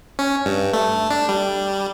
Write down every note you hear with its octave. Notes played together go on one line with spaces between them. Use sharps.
C#4
G2
A3
D4
G3